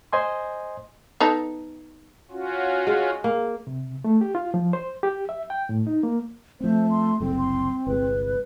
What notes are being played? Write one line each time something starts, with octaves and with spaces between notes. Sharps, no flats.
C5 D#5 G#5 C6
B3 D#4 A4
C#4 F4 F#4
G#3
A#3
C3
A3
G4
F4
F3
C5
G4
E5
G5
A2
D#4
A#3
F3 A3 C4 C5
C6
F#1 C2 C4 A4
C6
G1 C2 G#3 B4